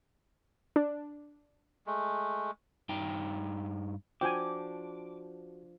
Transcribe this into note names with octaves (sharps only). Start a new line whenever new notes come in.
D4
G#3 A3
G2 D#4 G5
F3 D4 F#4 G5 G#5 D6